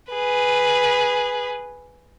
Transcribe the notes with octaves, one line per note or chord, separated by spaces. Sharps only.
G#4 B4